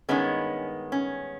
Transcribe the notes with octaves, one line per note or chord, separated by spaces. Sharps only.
G2 D#3 G#3 B3 C#4
C#4